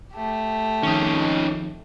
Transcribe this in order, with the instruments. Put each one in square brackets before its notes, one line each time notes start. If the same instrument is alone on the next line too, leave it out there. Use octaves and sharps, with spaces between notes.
[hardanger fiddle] A3 G4
[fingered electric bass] F2 D#3 [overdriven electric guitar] C#4 D#4